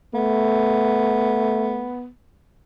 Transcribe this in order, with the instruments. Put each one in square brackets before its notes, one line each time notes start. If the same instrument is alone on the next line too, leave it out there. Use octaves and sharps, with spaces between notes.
[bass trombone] A3 [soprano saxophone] B3